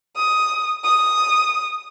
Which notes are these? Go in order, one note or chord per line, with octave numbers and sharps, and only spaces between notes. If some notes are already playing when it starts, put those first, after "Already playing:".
D#6
D#6